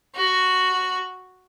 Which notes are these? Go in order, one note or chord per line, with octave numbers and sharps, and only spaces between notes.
F#4